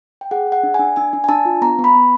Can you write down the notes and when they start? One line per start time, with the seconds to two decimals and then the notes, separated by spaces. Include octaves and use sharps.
0.21 G5
0.31 G#4 F#5
0.47 G#4 F#5
0.63 D4
0.74 G#5
0.79 D4
0.96 D4 G#5
1.13 D4
1.24 G#5
1.29 D4 A5
1.45 F4
1.62 B3 A#5
1.79 B3
1.84 B5
1.96 B3